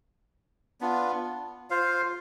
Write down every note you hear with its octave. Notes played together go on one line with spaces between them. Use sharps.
B3 D4 F4
F4 C5 F5